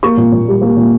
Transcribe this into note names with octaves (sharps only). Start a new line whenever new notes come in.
A#3 C#6
A#2
A#2
G3
A#3
A#2